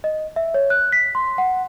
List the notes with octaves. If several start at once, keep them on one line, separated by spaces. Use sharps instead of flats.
D#5
E5
C#5
F#6
B6
C6
F#5